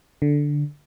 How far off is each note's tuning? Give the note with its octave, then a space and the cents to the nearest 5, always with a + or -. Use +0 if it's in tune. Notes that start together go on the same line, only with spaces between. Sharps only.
D3 -5